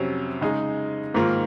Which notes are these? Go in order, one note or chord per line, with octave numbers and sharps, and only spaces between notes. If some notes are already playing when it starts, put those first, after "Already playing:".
Already playing: F2 C3 F#3 C#4
C#3 G#3 D#4 G#4
G#2 D#3 A#3 F4